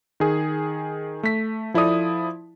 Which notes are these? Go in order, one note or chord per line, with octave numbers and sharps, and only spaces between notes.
D#3 G#4
A3 B6
F3 E4 A4 D5 D#6